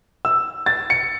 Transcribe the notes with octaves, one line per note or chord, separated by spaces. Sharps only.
E6
A6
C#7